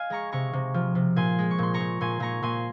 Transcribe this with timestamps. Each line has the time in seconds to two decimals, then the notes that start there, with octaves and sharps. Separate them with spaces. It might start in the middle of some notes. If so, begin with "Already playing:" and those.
Already playing: D#5 F5 G#5
0.10 G#3 A#5 C#6
0.32 C3 A#5 C#6
0.53 C3
0.74 F3
0.95 C3
1.16 A#2 G#5 C6
1.38 G#3
1.51 C#6
1.58 A#2 C6
1.74 A#5 C#6
1.80 A#2
2.01 A#2 G#5 C6
2.20 A#2 A#5 C#6
2.42 A#2 G#5 C6